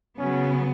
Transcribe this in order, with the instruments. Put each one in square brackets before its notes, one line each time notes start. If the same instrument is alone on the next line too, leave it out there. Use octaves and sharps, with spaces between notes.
[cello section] C#3 F#3 B3 [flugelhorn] C#4